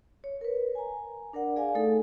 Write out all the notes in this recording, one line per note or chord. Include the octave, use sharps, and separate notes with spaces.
C#5
A#4 B4
G#5 A#5
D4 A#4 D5 F#5
G#4 D5 F5 G#5
A3 D#4 A4